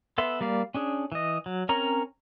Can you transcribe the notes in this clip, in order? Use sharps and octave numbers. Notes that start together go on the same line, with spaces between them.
B3 A4 B4 E5 C6
G3 A#3 D5 F5
C#4 D4 G#4
E3 D#5
F#3
C4 C#4 A#4 C#5 A#5